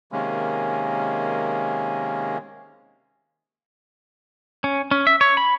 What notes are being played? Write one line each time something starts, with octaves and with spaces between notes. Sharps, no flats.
C3 D#3 G#3 A#3 C#4
C#4
C#4
E5
C#5
B5